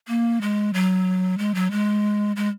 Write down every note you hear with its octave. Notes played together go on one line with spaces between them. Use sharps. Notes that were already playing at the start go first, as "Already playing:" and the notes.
A#3
G#3
F#3
G#3
F#3
G#3
G#3